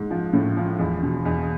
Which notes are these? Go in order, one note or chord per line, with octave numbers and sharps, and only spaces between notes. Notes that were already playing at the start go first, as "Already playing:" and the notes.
Already playing: G#2
F3
A2
F3
E2
B2
E2